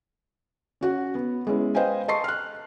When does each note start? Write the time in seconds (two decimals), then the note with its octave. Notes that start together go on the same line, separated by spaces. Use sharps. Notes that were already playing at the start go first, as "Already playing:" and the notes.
0.81 C#4 F#4 F#5
1.15 B3
1.47 G#3 B3 C#4 E4
1.75 B4 C5 D#5 F5 G5 G#5
2.08 D#5 A5 C6 C#6 C7
2.24 F6 F#6